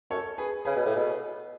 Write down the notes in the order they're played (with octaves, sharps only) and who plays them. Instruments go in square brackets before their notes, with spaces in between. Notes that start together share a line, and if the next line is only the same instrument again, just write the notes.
[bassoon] F#2 [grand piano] A4 C#5
[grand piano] G#4 B4
[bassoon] C#3 [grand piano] G#4 B4
[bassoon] B2
A2
B2